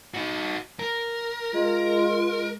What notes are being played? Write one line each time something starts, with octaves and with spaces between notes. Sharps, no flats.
D#4 F#4
A#4
G#3 F4 G#4 D#5